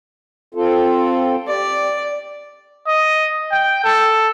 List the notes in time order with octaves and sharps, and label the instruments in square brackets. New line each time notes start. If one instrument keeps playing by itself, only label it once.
[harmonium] C4 F4 A4
[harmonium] G4 [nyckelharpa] D5
[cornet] D#5
G5
A4